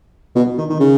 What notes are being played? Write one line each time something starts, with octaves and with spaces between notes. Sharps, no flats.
B2
D#3
D#3
C#3